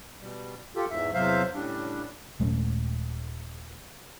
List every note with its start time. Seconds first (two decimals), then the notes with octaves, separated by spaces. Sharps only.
0.20 B2 G3
0.75 F4 G4 A4
0.90 E2 G#2 E5
1.14 E2 C3 F#3 C5 E5 F5
1.54 A2 C#3 G3 D4
2.40 D#1 G#3 A3 C#4